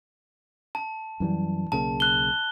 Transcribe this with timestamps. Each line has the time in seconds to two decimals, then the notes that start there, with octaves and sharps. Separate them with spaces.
0.75 A5
1.20 F#2 E3 G3
1.72 B1 C#3 A#3 A5
2.00 F#6 G7